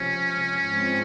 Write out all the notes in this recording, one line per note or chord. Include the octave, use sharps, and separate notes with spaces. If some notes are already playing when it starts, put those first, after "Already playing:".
Already playing: C3 F3 G#3 C#4
G#2 F3 G#3 C4